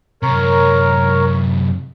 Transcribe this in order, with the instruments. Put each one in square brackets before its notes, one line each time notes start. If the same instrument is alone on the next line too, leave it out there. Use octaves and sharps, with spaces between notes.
[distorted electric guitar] F#2 C3 [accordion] A#4 C#5